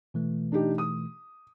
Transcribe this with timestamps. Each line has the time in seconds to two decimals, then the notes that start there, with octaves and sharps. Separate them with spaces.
0.14 B2 E3 A3
0.52 D4 D#4 G4
0.78 D#6